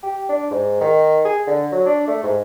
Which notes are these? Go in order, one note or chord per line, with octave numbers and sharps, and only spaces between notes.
G4
D4
G#2
D#3
G#4
D3
F#3
D4
A3
G#2